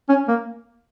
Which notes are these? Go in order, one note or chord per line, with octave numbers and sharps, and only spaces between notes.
C#4
A#3